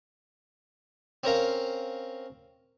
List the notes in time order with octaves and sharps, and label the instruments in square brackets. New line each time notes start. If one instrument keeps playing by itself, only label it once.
[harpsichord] C4 C#4 A#4 F5